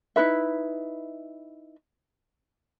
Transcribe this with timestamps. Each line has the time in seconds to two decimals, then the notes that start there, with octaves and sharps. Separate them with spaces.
0.16 D#4 E4 B4 E5